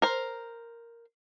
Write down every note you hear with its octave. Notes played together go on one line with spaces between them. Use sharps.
A#4 C5